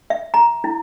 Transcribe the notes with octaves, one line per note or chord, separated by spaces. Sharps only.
E5
A#5
E4